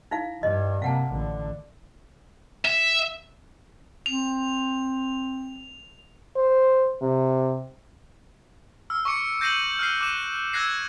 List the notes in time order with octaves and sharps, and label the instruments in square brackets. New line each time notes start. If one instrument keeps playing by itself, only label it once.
[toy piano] D#4 E4 F5
[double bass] G2 [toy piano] D#5
[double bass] C3 A#3 [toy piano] F5 F#5 A5
[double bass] A1 D3
[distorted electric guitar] E5
[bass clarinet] C4 [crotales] F7
[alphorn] C5
C3
[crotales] E6 F6
C#6 D6 C#7 D7
G6 A#6 C7 D#7 E7 F#7
F6 F#6 C7
D6 F#6 E7
E6 F#6 G#6 A#6 C7